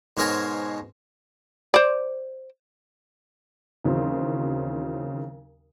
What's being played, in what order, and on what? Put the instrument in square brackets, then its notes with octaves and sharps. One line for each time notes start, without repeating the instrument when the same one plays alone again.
[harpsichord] G#2 B2 A#4 C5 C#5 G#5
[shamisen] C5 D5
[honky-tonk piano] D#2 C#3 E3 F#3 C4